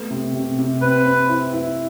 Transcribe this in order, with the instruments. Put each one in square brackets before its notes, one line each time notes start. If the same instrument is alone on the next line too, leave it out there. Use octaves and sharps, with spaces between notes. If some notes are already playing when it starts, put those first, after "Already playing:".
Already playing: [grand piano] A3 B3
C3
C3
C3
[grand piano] C4 [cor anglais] B4
[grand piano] C4
E4
E4